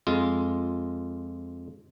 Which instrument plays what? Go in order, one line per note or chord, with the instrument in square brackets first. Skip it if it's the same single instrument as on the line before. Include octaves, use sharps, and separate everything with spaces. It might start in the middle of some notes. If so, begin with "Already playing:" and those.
[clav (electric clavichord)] F2 G#3 F4